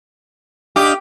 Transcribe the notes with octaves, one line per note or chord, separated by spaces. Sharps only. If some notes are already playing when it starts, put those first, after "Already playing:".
D4 G4 D#5 F5